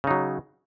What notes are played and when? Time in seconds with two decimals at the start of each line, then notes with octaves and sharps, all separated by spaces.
0.04 C#3
0.07 D#4
0.11 F#3